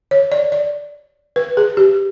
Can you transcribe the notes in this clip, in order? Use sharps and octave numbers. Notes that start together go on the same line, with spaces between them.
C#5
D5
D5
B4
G#4
G4